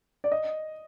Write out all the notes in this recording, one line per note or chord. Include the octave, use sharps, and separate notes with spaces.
D5
D#5